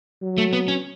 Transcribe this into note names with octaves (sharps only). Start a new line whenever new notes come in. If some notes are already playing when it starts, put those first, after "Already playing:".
F#3
A3
B3
C#4